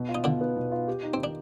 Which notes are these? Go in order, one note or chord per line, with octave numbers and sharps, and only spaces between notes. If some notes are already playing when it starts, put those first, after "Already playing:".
Already playing: B2
F4
D#4
B2 D3 D4
B3
B2
F4
G4
D#4
D#3 C4
D4